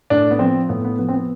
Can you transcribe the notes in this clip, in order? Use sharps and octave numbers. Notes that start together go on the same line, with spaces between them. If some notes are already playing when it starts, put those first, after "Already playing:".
A2 D4
B3
F3 C4
A2 B3
B3
F3 B3
C4
B3